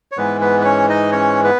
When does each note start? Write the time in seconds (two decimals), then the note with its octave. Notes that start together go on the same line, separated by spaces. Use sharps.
0.12 C#5
0.17 G#2 E3 G#3 B3 B4
0.41 B3 B4
0.61 B4
0.65 C#4 C#5
0.89 D#4 D#5
1.12 C#4 C#5
1.44 B3 B4